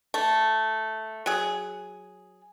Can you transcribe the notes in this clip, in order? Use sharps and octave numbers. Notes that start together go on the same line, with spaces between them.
A3
F#3 G#4